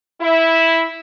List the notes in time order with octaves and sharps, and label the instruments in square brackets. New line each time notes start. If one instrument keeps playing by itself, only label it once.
[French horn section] E4